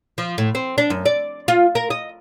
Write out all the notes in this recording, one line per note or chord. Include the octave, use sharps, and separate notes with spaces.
F3
A2
C4
D4
F#2
D5
F4
A#4
D#5